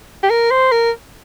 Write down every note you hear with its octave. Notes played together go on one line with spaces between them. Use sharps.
G4
A#4
C5
A#4